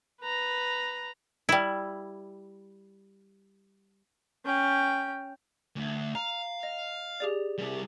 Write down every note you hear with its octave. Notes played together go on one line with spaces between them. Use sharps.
B4 A#5
G3 E4
C#4 G5
D2
F5 A#5
D#5
G4 G#4 D5
C3 G3